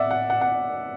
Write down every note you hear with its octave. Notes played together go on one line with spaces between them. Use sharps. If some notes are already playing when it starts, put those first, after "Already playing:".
Already playing: D5 E5 F#5
F#5
F#5
F#5